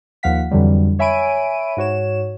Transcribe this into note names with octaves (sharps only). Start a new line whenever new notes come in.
D#2 F3 F5 F#5 B6
F2 D3 E3 F#3 G3
C#5 E5 G#5 B5 D7 D#7
G#2 F#4 C#5 E7